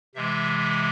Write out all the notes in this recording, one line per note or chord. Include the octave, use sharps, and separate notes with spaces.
C3 E3 G#3 E5
E5